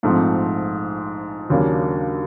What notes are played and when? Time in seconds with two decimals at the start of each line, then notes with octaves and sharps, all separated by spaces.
0.03 A#1 G#2 F3 A3 C4
1.50 D#2 C#3 F#3 A#3 D4